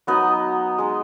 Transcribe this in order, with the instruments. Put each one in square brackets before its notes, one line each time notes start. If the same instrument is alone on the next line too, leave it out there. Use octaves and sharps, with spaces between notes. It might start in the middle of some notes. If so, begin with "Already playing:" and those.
[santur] F#3 B3 D#4 B4 D#5
G#3 D#4